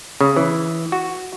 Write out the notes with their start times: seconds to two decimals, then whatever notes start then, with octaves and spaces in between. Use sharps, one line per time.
0.21 C#3
0.36 E3
0.92 F#4